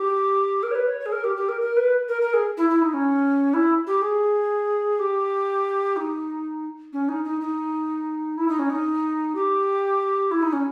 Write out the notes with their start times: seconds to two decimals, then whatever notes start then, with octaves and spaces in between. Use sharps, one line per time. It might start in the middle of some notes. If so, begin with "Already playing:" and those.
Already playing: G4
0.63 A#4
0.71 C#5
0.75 B4
0.87 C#5
1.00 C#5
1.05 G#4
1.12 A#4
1.24 G4
1.36 G4
1.48 A#4
1.61 A#4
1.77 B4
2.08 A#4
2.21 A#4
2.33 G#4
2.57 E4
2.69 E4
2.81 D#4
2.93 C#4
3.53 E4
3.86 G4
4.01 G#4
4.99 G4
5.96 D#4
6.92 C#4
7.08 D#4
7.24 D#4
7.41 D#4
8.37 E4
8.48 D#4
8.59 C#4
8.69 D#4
9.35 G4
10.31 E4
10.42 D#4
10.52 C#4